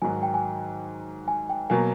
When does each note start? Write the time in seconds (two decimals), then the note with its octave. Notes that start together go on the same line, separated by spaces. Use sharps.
0.02 G#2 D#3 F#3 G#5
0.13 G#5
0.23 G5
0.34 G#5
1.28 G#5
1.49 G5
1.70 B2 F#3 A#3 G#5